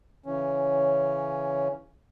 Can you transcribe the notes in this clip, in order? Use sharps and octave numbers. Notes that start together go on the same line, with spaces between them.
C#3 E3 C#4